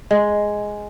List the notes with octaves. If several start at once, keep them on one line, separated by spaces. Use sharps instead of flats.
G#3